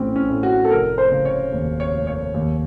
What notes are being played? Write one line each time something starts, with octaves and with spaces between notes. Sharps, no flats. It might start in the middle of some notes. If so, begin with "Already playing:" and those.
Already playing: A1 A2 C4 C#4
C#4
A2
F#4
A4
F1 A#4
C5
C#3
C#5
D#2
C#5
F1
C#5
D#2